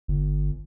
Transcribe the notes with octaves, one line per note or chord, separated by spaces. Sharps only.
G1